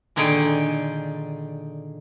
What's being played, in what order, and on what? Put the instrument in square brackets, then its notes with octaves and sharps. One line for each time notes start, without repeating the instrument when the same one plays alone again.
[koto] A#2 D3 D#3 G#4 G5